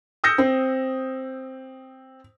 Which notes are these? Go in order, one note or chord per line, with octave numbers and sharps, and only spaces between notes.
D#6 E6 G6 A#6 C#7
C4